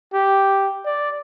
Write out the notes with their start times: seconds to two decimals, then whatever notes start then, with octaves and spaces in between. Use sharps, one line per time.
0.13 G4
0.85 D5